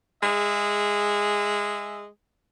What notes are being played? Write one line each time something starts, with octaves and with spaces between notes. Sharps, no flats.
G#3 G#4 E5